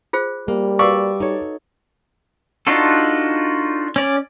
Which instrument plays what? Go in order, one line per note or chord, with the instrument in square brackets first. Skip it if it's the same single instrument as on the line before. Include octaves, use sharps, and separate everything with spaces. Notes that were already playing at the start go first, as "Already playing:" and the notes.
[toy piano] F4 G#4 C5
[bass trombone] G3 [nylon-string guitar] A#3
[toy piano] F#4 B4 F5 [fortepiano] D5 C#6 E6
[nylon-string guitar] D#4 A4 C#5
[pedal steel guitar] D4 D#4 F4 F#4 A4
C#4 D5